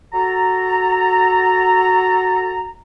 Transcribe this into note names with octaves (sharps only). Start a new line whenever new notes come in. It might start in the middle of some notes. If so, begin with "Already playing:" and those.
F#4 A4 A#5